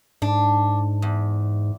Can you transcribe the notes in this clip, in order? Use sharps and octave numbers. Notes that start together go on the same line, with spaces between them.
G#2 D4
E2